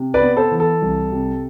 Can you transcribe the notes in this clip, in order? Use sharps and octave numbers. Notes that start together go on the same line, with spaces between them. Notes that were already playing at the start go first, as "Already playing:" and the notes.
Already playing: C3
B4 D5
B3
A4 C5
E3
A4
C2
C3